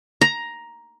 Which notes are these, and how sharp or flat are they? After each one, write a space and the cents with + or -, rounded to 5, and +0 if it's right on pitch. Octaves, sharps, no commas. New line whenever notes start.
A#5 +10